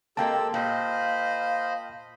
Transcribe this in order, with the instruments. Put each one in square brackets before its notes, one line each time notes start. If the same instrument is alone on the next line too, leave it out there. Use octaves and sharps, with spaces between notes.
[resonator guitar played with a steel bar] G#3 A#3 C4 [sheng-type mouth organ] G4 A4 E6 [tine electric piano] G5 A5
[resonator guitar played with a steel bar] A#2 [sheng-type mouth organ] C5 D#5 B5 [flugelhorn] F5